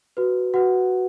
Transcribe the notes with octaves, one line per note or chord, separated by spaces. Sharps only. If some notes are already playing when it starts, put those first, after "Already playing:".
F#4 B4
F#4 B4 F#5